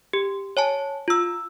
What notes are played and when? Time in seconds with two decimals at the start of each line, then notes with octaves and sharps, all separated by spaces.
0.13 G4
0.57 C#5 G#5 A5
1.08 F4 E6